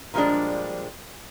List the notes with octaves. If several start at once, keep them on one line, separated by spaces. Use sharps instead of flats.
A#2 F3 G3 G#3 D4